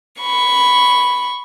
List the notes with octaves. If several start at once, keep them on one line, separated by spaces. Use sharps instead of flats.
B5 C#6